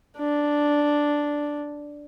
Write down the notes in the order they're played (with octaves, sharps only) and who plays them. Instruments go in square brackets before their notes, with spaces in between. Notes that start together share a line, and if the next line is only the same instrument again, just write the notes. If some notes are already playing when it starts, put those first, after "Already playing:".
[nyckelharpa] D4